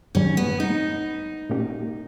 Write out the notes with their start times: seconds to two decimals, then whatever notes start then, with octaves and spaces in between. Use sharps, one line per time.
0.15 G2 D#3 G3 C#4
0.37 B3
0.60 D#4
1.50 A#2 A#3 C#4 G4